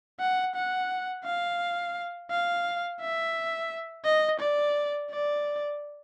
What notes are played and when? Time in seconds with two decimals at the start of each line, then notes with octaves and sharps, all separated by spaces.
0.20 F#5
0.56 F#5
1.25 F5
2.31 F5
3.01 E5
4.05 D#5
4.40 D5
5.11 D5